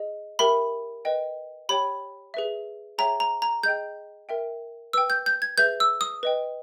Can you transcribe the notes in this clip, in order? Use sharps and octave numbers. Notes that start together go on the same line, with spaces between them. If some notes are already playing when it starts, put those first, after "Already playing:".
Already playing: G#4 D#5
G4 A#4 E5 G5 B5
B4 D#5 G5
G4 C#5 G5 B5
G#4 B4 E5
G#4 C#5 E5 G5 A#5
A#5
A#5
G#4 D#5 G5 G6
A#4 E5 G5
B4 G5 E6
G6
G6
G#6
G#4 B4 E5 G6
E6
D#6
B4 D#5 G5